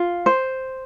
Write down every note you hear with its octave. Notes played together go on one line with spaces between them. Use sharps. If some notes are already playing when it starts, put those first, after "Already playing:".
Already playing: F4
C5